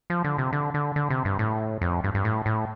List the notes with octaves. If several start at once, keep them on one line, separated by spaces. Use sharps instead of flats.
F3
D3
C3
D3
D3
D3
C3
G2
A2
F2
G2
G2
A2
A2